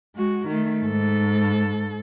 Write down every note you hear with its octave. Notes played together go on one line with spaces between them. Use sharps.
G#3 F#4
D#3 A3
G#2 A4